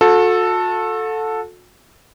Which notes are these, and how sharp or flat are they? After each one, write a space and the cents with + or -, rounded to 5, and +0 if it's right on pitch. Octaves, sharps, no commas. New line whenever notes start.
F#4 -40 A4 +0